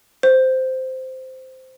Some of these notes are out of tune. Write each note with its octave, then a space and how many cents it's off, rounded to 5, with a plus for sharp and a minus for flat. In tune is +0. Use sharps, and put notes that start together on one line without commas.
C5 -10